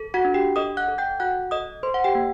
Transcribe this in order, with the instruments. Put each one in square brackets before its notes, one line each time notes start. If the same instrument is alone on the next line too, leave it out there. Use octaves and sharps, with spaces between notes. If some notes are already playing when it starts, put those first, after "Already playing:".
Already playing: [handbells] A4
F#4 F#5
D4
G4 G5
A4 D#5 D#6
F#5 F#6
A4
G5 G6
F#4 F#5 F#6
A4 D#5 D#6
A4 C5 C6
F#5
G4 G5
A#3